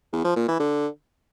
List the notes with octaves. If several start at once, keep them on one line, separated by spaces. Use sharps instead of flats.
E2
F3
A#2
E3
D3